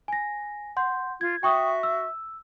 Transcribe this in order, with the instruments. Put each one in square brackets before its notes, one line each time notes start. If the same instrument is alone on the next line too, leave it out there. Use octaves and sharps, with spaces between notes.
[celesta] G#5 A#6
F#5 C6 G6
[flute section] F4 [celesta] G#6
[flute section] F#4 E5 [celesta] G5 C#6 D#6
[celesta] E6